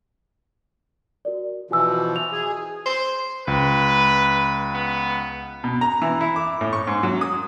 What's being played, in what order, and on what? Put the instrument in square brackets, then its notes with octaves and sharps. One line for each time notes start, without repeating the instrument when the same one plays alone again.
[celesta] F#4 A#4 D5
[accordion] B2 E3 F3 [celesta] F#4 G#5 E6
[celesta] F7
[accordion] G#4
[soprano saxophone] C5
[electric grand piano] C#2 [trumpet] B4
[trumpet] B3
[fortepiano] B2
A#5
E3
E4
D6
A2
C#6
G#2
F#3
D#6